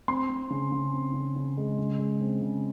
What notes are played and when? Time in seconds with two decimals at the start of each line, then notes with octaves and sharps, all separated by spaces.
0.08 C4 C6
0.30 C4
0.50 C#3
0.72 C#3
0.93 C4
1.14 C#3
1.36 C#3
1.57 G#3
1.79 C#3
1.99 G#3
2.21 C4
2.42 C#3